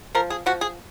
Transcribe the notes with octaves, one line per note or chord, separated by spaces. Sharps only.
F3 A#4
G#4
F3 F#4
G#4